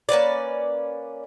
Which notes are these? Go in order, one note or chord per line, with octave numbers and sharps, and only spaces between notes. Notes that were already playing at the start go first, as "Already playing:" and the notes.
A#3 C#4 B4 D5